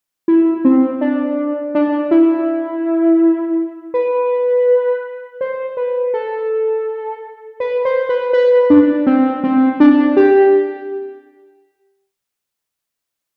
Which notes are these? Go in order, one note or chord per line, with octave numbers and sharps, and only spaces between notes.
E4
C4
D4
D4
E4
B4
C5
B4
A4
B4
C5
B4
B4
D4
C4
C4
D4
G4